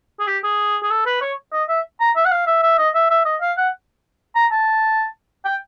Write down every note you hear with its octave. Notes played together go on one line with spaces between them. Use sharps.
G#4
G4
G#4
G#4
A4
B4
C#5
D#5
E5
A#5
E5
F#5
F5
E5
E5
D#5
E5
E5
D#5
F5
F#5
A#5
A5
G5